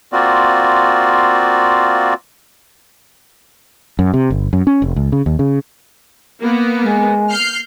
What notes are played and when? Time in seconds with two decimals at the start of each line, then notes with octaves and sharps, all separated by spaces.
0.12 A#3 C4 F4 F#4 D5
3.99 F#2
4.14 C3
4.30 G1
4.53 F#2
4.67 C#4
4.82 F1
4.96 C#2
5.12 C#3
5.26 D#2
5.39 C#3
6.39 A#3 B3
6.82 G#3
7.30 F6 G6 C7